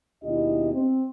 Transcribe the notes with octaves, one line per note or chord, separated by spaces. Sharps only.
D#2 B2 D4 E4 G4 D#5
C4